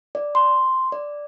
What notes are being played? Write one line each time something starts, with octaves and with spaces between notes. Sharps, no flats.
D5
C6
D5